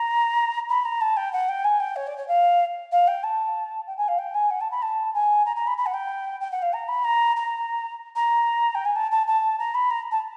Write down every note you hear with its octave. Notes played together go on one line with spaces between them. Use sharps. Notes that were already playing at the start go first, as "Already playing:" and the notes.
Already playing: A#5
B5
A#5
A5
G5
F#5
G5
G#5
G5
C#5
D5
C#5
F5
F5
G5
A5
G5
G#5
F5
G5
G#5
F#5
A5
B5
A5
G#5
A#5
A#5
B5
B5
F#5
G5
G5
F#5
F5
A#5
B5
A#5
A#5
A#5
G5
G#5
A5
A5
A5
A#5
B5
A#5
A5